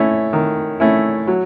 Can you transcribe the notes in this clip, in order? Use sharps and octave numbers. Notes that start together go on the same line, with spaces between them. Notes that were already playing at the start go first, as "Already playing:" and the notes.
Already playing: A3 C#4 E4
D#3
A3 C#4 E4
F#3